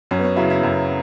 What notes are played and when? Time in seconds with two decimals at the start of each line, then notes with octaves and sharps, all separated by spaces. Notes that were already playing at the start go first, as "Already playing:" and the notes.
0.11 F#2 C#4
0.19 B3
0.24 C#4
0.36 C#3 F#3 E4
0.50 E4
0.63 F#2